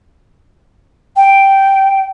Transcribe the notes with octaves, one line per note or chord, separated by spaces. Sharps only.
G5